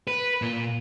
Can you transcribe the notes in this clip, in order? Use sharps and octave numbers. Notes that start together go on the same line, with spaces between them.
B4
A#2